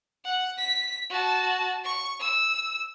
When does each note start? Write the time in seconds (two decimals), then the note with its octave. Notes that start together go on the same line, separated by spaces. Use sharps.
0.25 F#5
0.58 B6
1.10 F#4 A5
1.84 C#6
2.20 E6